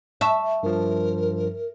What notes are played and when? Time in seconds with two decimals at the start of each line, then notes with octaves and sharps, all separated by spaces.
0.21 E5 A5 C#6
0.63 G2 F3 A#4